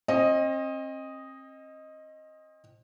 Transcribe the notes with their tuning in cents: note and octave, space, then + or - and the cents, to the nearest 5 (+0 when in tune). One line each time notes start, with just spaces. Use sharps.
C4 +40 D#5 +0